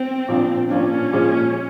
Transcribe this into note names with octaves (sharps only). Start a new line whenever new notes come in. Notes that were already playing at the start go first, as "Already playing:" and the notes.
Already playing: C4
A#2 F3 A#3 D4
A#2 F3 A#3 C#4 D4
A#2 F3 G#3